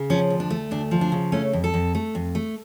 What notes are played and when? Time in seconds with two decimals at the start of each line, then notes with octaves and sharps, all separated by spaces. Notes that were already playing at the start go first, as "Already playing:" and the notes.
Already playing: C#3
0.10 F3 C#4
0.30 D2
0.40 D4
0.50 A3
0.71 D2 D4
0.91 F3
1.01 D4
1.12 C#3
1.32 A3 C#4
1.53 F2
1.64 A4
1.74 F2
1.95 A3
2.15 F2
2.35 A3